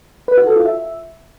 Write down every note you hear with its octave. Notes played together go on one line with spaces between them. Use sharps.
B4
F#4
A4
F4
E5